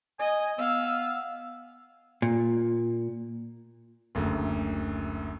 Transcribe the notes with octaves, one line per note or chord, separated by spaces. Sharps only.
D#5 G#5
B3 F5 E6
A#2
F#1 D2